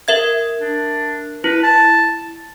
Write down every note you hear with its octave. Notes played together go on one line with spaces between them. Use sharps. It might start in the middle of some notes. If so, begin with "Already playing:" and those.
A#4 E5 G#6
D4
E4 B4
A5